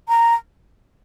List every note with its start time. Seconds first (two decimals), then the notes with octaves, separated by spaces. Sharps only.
0.09 A#5